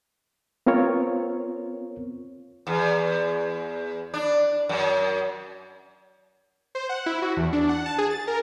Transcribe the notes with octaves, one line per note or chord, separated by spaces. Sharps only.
B3 C4 F4 A#4 C#5
E2
D4
F#2
C5
F#5
E4
F#4
E2
D4
F#5
A5
G#4
A6
A#4